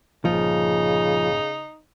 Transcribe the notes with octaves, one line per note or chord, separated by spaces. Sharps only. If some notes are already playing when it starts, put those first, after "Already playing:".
G1 A#2 C#3 F3 D#4